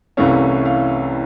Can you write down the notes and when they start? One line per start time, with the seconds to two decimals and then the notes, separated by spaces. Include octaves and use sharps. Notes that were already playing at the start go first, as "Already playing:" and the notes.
0.17 C2 C3 E3 A3 C#4 F5
0.65 F5